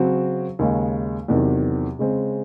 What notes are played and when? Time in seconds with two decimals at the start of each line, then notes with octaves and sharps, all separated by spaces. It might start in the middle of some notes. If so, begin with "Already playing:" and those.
Already playing: C#3 F#3 C4 F#4
0.59 D#2 C#3 G#3
1.28 E2 C3 D#3 F#3
1.99 C#3 G#3 C4